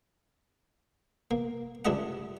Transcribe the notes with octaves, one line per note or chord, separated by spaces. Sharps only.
A#3
C#2 G2 E4 D5 D#5 F#5